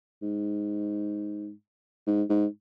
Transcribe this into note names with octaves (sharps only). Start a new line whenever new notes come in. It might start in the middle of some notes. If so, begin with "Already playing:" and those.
G#2
G#2
G#2